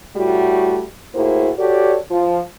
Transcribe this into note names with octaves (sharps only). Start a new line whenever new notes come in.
A2 G3 A3 F#4
A2 A#3 E4 F#4 G#4 C5
F#4 G4 A4 C#5 D5
F3